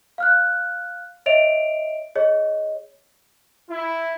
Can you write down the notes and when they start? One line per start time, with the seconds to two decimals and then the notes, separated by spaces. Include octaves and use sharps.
0.18 F5 F6 F#6
1.26 C#5 D#5 E5 D7 F7
2.15 G#4 C#5 D#5
3.70 E4